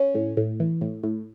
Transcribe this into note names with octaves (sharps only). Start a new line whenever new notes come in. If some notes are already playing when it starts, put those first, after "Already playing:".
Already playing: C#4
A2
A2
E3
A2
A2